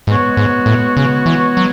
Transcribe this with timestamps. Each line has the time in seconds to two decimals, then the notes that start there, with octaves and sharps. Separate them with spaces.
0.07 G#2 B2 G#3 B3 F#4 C#5
0.37 G#2
0.66 A2
0.97 C#3
1.26 E3
1.57 F#3